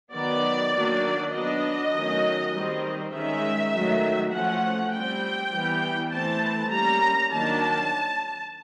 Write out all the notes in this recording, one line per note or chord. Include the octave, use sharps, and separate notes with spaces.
D#3 F#3 B3 D5
D#3 F#3 A#3 D4
F#3 B3 D4 D#5
D#3 F#3 A3 C#4
D#3 G3 C4
D#3 G#3 C#4 E5
D#3 F#3 A3
F3 A3 C#4 F#5
G3 C4 G5
E3 G3 B3
E3 A3 C4 A5
G3 A#3 C#4 A#5
D#3 F#3 A#3 D4 A5